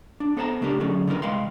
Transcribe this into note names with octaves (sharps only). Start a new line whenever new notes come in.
D4
B3 A4 C5 D#5 A5 A#5
C#3 A3 D4 G4 A#4
D3 F#3 C#4 D#4 G#4 A4
D3 E3 A3 D4 A#4 B4
C2 E3 G#3 F5 G5 C6